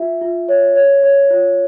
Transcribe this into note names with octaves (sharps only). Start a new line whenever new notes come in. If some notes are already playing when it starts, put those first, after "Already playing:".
Already playing: F4 E5
F4
C#5
C#5
C#5
F4